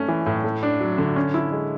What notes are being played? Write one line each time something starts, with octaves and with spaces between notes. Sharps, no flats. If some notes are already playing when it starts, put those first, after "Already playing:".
Already playing: A3 C#4
E3
A2
A3
D4
F#3
D3
C#4
E4
G#3